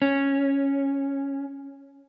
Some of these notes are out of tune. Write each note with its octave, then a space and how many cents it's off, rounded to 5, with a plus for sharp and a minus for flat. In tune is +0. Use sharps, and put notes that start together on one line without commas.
C#4 -5